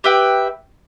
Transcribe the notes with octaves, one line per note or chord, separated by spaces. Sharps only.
G4 B4 E5 G5